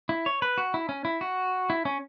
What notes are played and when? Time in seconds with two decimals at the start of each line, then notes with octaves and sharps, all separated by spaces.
0.09 E4
0.26 C#5
0.42 B4
0.58 F#4
0.74 E4
0.89 C#4
1.05 E4
1.21 F#4
1.70 E4
1.85 C#4